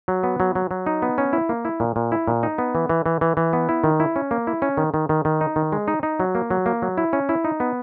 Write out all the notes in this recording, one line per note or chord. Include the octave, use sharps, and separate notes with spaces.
F#3
B3
F#3
F#3
F#3
D#4
B3
C#4
E4
A#3
E4
A#2
A#2
E4
A#2
D#4
B3
E3
E3
E3
E3
E3
B3
E4
D#3
E4
C#4
A#3
E4
C#4
D#3
D#3
D#3
D#3
D#4
D#3
G#3
D#4
D#4
F#3
A#3
F#3
A#3
F#3
E4
C#4
E4
D#4
B3